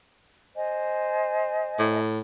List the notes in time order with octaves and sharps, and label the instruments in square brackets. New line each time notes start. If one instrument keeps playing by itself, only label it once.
[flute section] C5 D#5 G#5
[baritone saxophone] A2